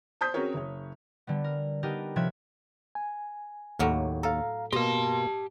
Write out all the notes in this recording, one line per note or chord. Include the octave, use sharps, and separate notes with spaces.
C5 A5 D#6 G6 B6
C4 C#4 F#4 G#4 A#4 C#5
F#1 C#5
D3 G3 B3
A#4
B3 D4 D#4 G4 A#4
C3 F3 C#5 E5 F#6 G#6
G#5
D#2 A2 F#3 A#3
A4 F5 A#5
B2 A#3 G4 D#5 A5 C6